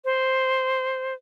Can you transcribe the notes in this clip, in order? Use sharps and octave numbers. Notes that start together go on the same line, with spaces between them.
C5